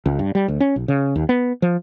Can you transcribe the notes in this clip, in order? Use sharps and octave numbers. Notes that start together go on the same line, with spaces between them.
C#2
G2
G3
D2
C#4
B1
C#3
D#2
B3
F3